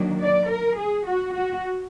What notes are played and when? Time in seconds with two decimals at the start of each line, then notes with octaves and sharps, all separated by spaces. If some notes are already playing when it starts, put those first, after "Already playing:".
Already playing: D#3 F#3 A#3 D4
0.22 D5
0.49 A#4
0.78 G#4
1.06 F#4
1.33 F#4